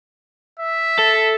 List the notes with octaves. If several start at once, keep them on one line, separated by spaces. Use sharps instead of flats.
E5
A4